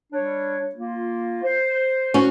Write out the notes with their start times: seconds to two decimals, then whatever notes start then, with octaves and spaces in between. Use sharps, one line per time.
0.13 G3 D4 C#5
0.74 A#3 F4
1.43 C5
2.14 C#4 F#4